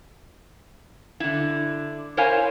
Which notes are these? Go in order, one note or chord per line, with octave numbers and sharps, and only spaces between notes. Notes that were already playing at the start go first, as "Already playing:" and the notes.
D3 E4
E4 A#4 C5 C#5 F5 G#5